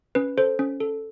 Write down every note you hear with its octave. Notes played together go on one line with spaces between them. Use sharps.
C#4 B4
A4 C5
C#4
A4